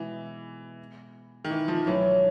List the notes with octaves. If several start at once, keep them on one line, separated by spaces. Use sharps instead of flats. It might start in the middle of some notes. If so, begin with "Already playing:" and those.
Already playing: B2 E3 G#3 B3
D#3
E3
F3
C#2 B2 E3 F#3 A3 D4